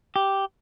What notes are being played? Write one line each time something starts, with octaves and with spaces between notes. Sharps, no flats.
G4